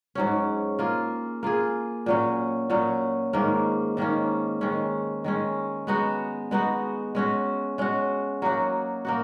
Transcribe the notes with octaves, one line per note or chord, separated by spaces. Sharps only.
G#2 F#3 C#4
A#3 F4 G#4
A#3 F4 G#4
A#2 F#3 C#4
A#2 F#3 C#4
G#2 D#3 A#3 C#4
G#2 D#3 A#3 C#4
D#3 G#3 C#4
D#3 G#3 C#4
G#3 B3 D#4 F#4
G#3 B3 D#4 F#4
G#3 C#4 F#4
G#3 C#4 F#4
F#3 A#3 D#4 F#4
A#3 D#4 F#4